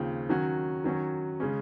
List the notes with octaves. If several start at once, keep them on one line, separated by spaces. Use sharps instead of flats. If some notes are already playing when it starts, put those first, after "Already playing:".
Already playing: D#2 C#3 F3 C4
D#3 F#3 C#4 F#4
D#3 F#3 C#4 F#4
C#3 G#3 C#4